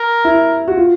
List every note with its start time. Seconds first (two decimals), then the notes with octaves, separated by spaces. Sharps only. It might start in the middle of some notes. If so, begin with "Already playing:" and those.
Already playing: A#4
0.24 E4
0.68 F#4
0.77 F4